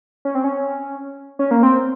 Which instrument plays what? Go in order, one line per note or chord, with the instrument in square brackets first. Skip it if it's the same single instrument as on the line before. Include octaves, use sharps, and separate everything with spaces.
[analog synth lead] C#4
C4
C#4
C#4
A#3
C4